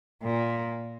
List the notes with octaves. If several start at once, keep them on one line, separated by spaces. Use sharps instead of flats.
A#2